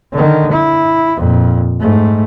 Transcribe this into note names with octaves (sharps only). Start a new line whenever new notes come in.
D3 D#3
E4
F2 A#2
G#2 A3